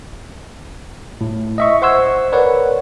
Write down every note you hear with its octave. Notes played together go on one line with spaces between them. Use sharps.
A2
D#5 E5 C#6
C5 F#5 C6 C#6 E6 G#6
A#4 B4 C#5 D5 F#5